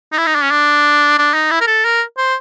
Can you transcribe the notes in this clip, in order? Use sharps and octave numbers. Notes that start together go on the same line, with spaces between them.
D#4
E4
D#4
D4
C#4
D4
D4
D#4
E4
A#4
A4
A#4
C5